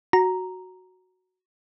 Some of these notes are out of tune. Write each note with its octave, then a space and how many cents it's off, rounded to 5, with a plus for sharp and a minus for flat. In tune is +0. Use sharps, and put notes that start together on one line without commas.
F#4 +0 A#5 +0